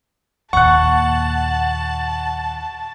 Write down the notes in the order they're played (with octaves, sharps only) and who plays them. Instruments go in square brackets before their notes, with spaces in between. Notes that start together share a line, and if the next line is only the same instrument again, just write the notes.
[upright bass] D#2 A#2 [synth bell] F#5 [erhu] A5 [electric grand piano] C#6 F#6